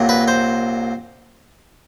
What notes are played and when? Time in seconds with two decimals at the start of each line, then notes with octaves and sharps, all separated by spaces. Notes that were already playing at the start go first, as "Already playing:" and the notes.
Already playing: C2 A#2 F#3
0.09 B4
0.28 C5